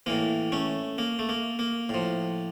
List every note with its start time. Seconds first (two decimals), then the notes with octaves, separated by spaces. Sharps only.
0.06 A2 E3 A#3
0.52 A3 C#4
0.98 A#3
1.19 A3
1.29 A#3
1.59 A#3
1.89 A2 F3